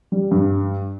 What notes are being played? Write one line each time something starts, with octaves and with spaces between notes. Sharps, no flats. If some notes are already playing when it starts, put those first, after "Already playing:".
G3
G2